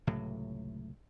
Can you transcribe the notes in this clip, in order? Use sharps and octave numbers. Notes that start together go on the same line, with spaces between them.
C#2 A2 C3 F#3